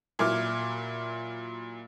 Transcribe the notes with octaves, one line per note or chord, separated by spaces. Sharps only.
A#2 F#3 E4 D6 F6